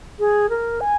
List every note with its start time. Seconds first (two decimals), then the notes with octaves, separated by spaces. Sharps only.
0.19 G#4
0.50 A#4
0.81 G#5